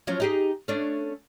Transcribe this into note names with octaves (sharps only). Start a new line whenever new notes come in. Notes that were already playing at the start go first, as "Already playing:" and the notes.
F3 F#3 C#4
D#4 G4 G#4
A3 C#4 D4